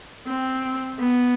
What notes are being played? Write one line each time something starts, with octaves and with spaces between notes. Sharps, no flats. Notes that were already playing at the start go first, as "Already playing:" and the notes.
C4
B3